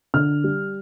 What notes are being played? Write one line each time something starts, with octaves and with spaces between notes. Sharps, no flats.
D3 F6
G3